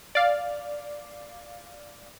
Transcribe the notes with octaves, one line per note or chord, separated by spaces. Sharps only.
D5 F5